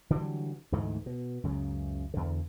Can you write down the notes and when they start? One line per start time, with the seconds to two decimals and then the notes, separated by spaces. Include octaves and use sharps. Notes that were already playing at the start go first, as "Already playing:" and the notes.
0.10 D3 E3 F#3 G3
0.72 D2 G#2 E3 A3
1.06 B2
1.43 C#2 F#2 C#3
2.14 E2 D3